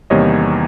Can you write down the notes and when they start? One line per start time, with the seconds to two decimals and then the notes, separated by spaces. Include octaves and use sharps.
0.10 E2 C3 D#3 G3 A#3 C#5 D#5